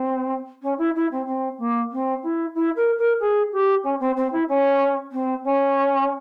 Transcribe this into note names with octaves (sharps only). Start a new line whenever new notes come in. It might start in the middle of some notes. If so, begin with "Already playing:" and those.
Already playing: C4
C#4
E4
E4
C4
C4
A#3
C4
E4
E4
A#4
A#4
G#4
G4
C#4
C4
C4
E4
C#4
C4
C#4